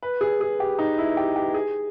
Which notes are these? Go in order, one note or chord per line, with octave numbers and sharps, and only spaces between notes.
B4
G#4
G#4
G4
D#4
E4
G4
G4
G#4